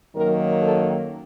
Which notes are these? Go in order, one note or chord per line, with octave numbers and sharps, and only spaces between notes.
F#2 D#3 F#3 A#3 A#4
A4